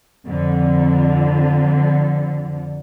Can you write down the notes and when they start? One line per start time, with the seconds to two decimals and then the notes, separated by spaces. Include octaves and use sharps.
0.26 F2 D3